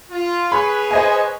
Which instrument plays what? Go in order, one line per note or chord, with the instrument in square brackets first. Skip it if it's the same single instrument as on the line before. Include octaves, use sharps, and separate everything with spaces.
[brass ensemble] F4
[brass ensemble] G#4 B4 C#5 [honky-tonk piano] B5
[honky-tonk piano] C5 D#5 G#5